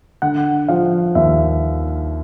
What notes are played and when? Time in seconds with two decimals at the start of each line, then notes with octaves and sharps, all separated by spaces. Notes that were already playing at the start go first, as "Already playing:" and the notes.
0.22 D3 F#5
0.68 F3 F5
1.15 D#2 E5